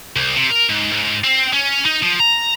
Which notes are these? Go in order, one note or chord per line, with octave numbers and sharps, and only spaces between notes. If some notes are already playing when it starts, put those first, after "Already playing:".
C2
C3
A#4
G#2
G#2
C4
C#4
D#4
F3
A#5